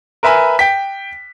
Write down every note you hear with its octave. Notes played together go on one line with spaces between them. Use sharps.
A#4 B4 E5 G#5 B5
G5 B6